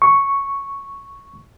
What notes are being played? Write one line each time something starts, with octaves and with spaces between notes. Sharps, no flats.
C#6